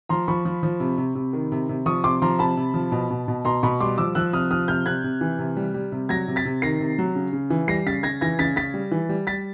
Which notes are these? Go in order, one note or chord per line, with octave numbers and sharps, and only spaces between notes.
F3 A#5 C6
F3 B5 C#6
F3
F3
C3
C3
C3
D#3
C3
C3
F3 C#6 D#6
C3 C6 D6
F3 A#5 C6
C3 A5 B5
C3
F3
B2
B2
B2
B2 A#5 C6
B2 B5 C#6
G3 C6 D6
F3 D6 E6
F3 E6 F#6
C3 D#6 F6
F3 D#6 F6
C3 F6 G6
C3 F#6 G#6
C3
E3
C3
G3
G3
C3
F#3 G#6 A#6
C3
A6 B6
C3
D#3 A#6 C7
C3
F#3
C#3
C#3
E3
G3 A#6 C7
C#3 A6 B6
C#3 G#6 A#6
E3 G#6 A#6
C#3 A6 B6
C#3 A6 B6
G3
E3
G3
G3 A6 B6